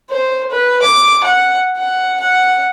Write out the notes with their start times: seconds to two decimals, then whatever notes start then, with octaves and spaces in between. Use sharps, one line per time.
0.10 C5
0.51 B4
0.83 D6
1.24 F#5
1.77 F#5
2.21 F#5